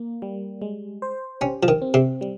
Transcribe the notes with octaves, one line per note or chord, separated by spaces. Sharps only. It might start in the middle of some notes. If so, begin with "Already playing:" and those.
Already playing: A#3
G3
G#3
C5
C#4 G4
F3
D#3
C4
C3
G3